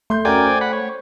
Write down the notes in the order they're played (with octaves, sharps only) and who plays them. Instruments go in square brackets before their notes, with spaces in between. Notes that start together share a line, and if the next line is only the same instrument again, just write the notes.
[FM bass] A3 [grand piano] C6 G6
[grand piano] C#4 F#4 A#4 [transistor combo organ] D5 G5 G#5
[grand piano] C5
[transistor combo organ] F#5 B5
C#5